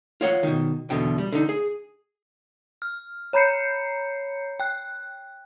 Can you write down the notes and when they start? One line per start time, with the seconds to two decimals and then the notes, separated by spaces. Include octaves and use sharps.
0.21 F4 C#5 F#5
0.43 B2 D#3
0.90 E2 B2 D3 G5
1.18 G3
1.32 D3 D#4
1.49 G#4
2.82 F6
3.33 C#5 A#5 B5 G6 C7 C#7
4.60 G5 F#6